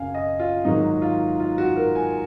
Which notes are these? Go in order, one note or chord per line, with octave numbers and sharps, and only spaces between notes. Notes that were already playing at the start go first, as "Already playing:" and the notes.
Already playing: F#2 C#3 F#3 F5 G#5
D#5
F4
G#2 D#3 F#3 D#4
F4
F4
F#4
A#4
G#5